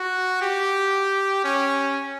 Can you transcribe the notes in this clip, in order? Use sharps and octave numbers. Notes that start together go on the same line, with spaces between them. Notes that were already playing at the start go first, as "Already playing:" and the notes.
Already playing: F#4
G4
C#4